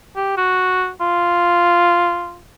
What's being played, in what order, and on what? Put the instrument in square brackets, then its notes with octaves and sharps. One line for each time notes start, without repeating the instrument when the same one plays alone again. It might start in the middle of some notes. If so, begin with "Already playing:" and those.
[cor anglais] G4
F#4
F4